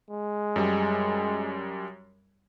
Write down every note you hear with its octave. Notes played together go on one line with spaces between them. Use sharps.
G#3
F#2 G3